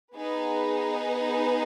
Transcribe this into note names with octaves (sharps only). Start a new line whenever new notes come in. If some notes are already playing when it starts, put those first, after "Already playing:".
B3 D#4 G#4 B4